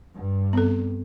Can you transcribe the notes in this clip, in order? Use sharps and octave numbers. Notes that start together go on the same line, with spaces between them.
G2
B3 C4 A4